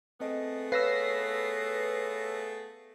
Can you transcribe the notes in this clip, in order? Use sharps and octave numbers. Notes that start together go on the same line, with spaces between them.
A3 B3 C4 G#4 D#5
B4 C#5 F5 E6 A#6 C7